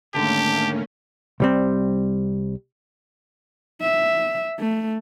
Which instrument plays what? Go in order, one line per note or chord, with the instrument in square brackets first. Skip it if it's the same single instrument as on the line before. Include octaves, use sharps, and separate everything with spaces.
[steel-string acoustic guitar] G#2 D3 D#3 [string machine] A3 A#3 C#4 [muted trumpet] G4 [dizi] A5
[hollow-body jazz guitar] C2 G3 C4
[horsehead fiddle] E5
A3